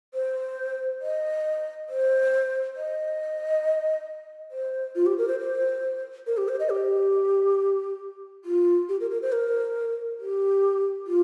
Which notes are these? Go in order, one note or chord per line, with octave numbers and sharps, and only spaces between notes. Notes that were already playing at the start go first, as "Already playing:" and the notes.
C5
D#5
C5
D#5
C5
F4
G4
A#4
C5
C5
A#4
G4
C5
D#5
G4
F4
G4
A#4
A#4
C5
A#4
G4
F4